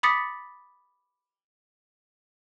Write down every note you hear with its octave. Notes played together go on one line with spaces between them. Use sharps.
B5 D6 D#6 A6 B6 C#7